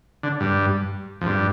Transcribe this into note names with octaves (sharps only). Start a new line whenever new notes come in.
D3
G2
F2
G2